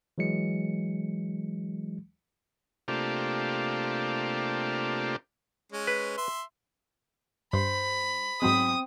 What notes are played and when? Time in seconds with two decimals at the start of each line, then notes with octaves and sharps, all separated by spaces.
0.18 E3 F#3 G#3 C#7
2.88 C3 A3 A#3 D4 F4 G4
5.72 G#3 C#4
5.87 B4
6.18 E5 C6
7.53 G2 C5 B5
8.42 G#2 F#3 G#3 C4 D#6